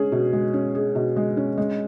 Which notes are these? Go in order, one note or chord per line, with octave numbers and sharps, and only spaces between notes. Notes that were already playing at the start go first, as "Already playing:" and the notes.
Already playing: G#3 C#4 G#4
B2
G#3
C#4
G#4
B2
G#3
C#4
G#3